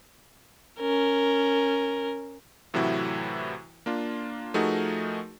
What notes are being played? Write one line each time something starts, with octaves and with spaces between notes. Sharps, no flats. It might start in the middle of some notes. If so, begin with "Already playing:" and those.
C#4 A#4
A2 C3 E3 F#3 E4 F#4
A#3 D4 F4
F3 A3 D#4 F#4 G#4 A#4